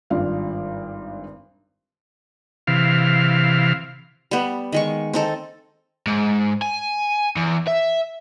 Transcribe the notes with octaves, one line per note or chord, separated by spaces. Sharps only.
G#1 G2 F4 D5 F5
C3 E3 F5
G3 B3
D#3 G#3 C#6
C4 D#4 A4
G#2
G#5
E2
E5